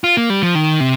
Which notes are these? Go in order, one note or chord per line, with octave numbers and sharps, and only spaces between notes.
F4
A#3
G3
F3
D#3
C3